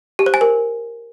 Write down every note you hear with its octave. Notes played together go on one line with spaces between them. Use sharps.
G4
C5
G#5
A#4